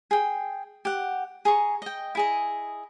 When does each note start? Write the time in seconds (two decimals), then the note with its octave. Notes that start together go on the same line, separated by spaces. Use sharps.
0.11 G#4 G5
0.85 G4 F#5
1.45 G#4 A#5 C#6
1.82 D#5 G5
2.15 E4 G#4 D#5